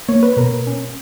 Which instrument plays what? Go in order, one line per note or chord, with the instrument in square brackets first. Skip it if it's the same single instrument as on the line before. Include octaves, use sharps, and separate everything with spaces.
[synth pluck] A#3 C#5
B4
B2 A#4
C#4